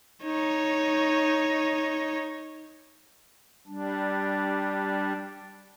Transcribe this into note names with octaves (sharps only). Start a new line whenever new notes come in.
D#4 C#5
G3 D4